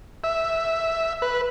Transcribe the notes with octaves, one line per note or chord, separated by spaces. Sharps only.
E5
B4